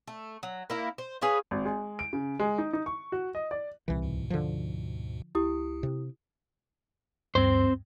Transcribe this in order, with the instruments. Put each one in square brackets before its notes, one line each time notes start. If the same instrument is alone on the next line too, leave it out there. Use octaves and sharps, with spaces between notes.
[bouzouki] A3
F#3
A#3 E4
C5
G#4 B4 C#5 F5
[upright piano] G#1
G#3
D7
C#3
G#3
D#4
D#4
C#6
F#4
D#5
D5
[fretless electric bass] C2 E3 [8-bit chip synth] A#2
[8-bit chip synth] D2 G#2 B2
[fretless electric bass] D3 F3
[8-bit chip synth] C#2 [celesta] E4 G4 D#6
[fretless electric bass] C3
[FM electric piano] D2 G2 [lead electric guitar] C4 C5